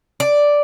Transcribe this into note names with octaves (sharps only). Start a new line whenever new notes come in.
D5